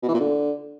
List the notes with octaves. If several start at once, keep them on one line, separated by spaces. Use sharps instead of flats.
B2
E3
A#2
D3